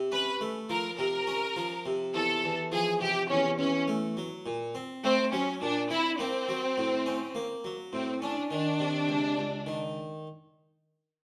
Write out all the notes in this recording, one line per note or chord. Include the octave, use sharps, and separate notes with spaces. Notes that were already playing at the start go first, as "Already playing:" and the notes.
Already playing: C3
C#4 B4
A3
F3 A#4
C3 A#4
C#4
F3
C3
E2 A4
E2
F3 G#4
C3 G4
E2 C#4
E2 C#4
A3
F#3
A#2
C4
A3 C4
F#3 C#4
A#2 D4
C4 E4
A#3 C4
F#3
A2
C#4
A#3
F#3
A2 C4
C#4 D4
D#3 D4
C3
C#2
C#2
D#3